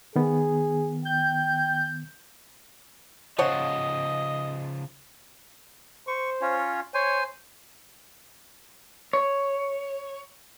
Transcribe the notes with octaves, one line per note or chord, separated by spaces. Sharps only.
D#3 B3 G#4
G5 G6
C#3 F3 C5 C#5 D#5 F#5
C5 C#6
C#4 F4 C#5
C5 C#5 G#5
C#5